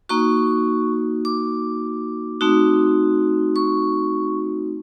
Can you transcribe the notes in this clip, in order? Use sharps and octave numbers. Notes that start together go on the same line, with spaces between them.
A#3 D#4 F#4 C#6
D6
A3 C4 D#4 F#4
C#6